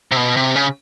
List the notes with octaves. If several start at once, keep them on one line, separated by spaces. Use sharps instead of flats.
C3
B2
C3
C#3